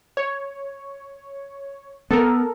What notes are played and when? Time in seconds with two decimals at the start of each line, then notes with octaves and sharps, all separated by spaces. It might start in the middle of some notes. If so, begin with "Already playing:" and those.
0.17 C#5
2.11 B3 A4 A#4